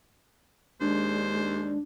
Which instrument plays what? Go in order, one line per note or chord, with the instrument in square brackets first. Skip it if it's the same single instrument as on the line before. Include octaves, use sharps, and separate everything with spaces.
[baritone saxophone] D#2 [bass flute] G#3 [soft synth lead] D4 [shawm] C5